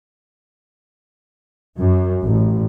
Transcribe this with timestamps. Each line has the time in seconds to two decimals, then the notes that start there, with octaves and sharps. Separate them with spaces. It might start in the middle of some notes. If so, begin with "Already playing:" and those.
1.78 F#2
2.24 A1